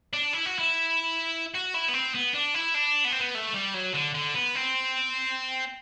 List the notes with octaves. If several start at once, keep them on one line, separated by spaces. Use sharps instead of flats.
D4
E4
F#4
E4
F#4
E4
B3
C4
B3
D4
E4
D4
B3
C4
B3
A3
G3
F#3
D3
D3
B3
C4